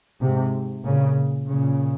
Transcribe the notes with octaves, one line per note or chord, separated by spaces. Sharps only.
G#2 C3
A#2 C#3
A#2 C#3